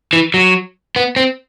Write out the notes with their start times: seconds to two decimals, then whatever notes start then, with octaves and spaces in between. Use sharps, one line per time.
0.13 E3
0.34 F#3
0.96 B3
1.16 C4